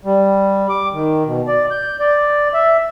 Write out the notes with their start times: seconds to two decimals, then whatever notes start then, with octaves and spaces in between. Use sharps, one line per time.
0.05 G3
0.69 D6
0.93 D#3
1.26 B2
1.47 D5
1.71 G6
2.00 D5
2.54 E5